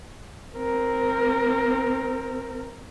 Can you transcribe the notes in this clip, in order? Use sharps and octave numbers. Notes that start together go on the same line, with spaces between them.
C4 A#4